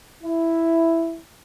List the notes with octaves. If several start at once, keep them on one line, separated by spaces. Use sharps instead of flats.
E4